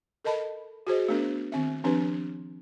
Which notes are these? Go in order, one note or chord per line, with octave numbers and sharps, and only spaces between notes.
A4 A#4 D#5 A5 B5
F#4 G#4 C5 D#5
A3 B3 D4 A#4
D#3 C4 E5
F3 C4 D4 G4 B4